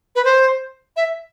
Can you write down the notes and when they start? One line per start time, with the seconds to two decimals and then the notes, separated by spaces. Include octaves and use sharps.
0.15 B4
0.25 C5
0.97 E5